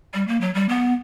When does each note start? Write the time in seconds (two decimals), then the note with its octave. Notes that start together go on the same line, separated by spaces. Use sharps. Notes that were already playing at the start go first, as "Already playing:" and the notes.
0.14 G3
0.28 A#3
0.41 F#3
0.54 G3
0.69 B3